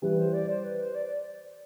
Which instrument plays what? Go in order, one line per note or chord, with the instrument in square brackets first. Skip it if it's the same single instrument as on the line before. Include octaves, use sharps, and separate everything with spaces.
[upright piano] E3 G3 [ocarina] B4
[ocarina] C5
D5
C5
B4
C5
D5